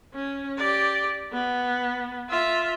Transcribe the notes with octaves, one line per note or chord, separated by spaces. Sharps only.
C#4
G4 D5
B3
F4 E5